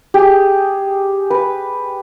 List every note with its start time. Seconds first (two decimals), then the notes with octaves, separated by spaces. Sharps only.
0.14 G4 G#4
1.30 B4